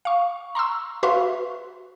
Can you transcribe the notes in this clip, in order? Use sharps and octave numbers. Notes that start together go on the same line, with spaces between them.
F5 C#6
A#5 C6 C#6 E6
F#4 B4 E5 F5 C6 C#6